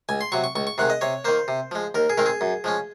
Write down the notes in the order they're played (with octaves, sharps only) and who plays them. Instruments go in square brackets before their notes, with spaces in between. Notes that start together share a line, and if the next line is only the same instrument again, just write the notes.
[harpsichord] C#2 G#5
C6
C3 F#3 C#6
C#6
C#2 C#6
C#6
C3 D#3 G#3 F#5
D#5
C3 C#5
D#3 A#3 C5
C3
F3 G#3
D#2 A#4
G#4
D#3 G#3 C4 A#4
G#4
F#2
F3 G#3 C#4